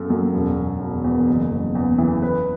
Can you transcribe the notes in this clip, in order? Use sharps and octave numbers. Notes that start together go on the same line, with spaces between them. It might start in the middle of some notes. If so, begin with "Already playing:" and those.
Already playing: F#2 A4
F#2
E1
E1
E1
E2
F#1
F#1
E2
E3
B4